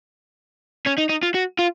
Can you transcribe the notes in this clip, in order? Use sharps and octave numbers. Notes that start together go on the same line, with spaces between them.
C#4
D#4
D#4
F4
F#4
F4